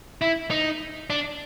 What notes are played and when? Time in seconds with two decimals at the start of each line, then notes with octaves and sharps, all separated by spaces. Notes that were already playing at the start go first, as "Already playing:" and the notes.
0.21 E4
0.51 D#4
1.10 D4